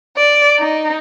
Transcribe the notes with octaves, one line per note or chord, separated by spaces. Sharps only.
D5
D#4